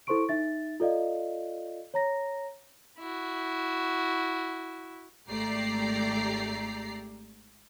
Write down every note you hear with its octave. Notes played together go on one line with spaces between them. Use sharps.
E4 A4 C5 C6 C#6 D7
D#4 E5 A6
F4 A4 D5 D#5 F5
C#5 A#5 A#6
E4 F#4
G#1 A3 G4 D5 A#5 C7